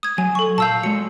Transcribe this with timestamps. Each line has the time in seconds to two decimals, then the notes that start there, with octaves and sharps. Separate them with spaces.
0.03 D#6 G#6
0.18 F#3 G#5
0.35 A4 C#6
0.58 A#2 F5 A5 E6 G6
0.83 F#3 G#3 C#7